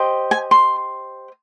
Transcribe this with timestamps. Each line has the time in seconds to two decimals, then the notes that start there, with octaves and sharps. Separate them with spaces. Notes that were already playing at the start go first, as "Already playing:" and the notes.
Already playing: G4 C5 D#5
0.31 G#5
0.51 C6